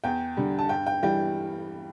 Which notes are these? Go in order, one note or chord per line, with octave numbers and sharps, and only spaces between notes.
E2 G5
D3 G3
A5
G2 G5
G5
E3 G3 G5